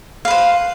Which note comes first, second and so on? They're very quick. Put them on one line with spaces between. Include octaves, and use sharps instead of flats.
F5 B4 C5